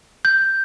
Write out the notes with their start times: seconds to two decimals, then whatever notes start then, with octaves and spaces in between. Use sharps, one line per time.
0.25 G6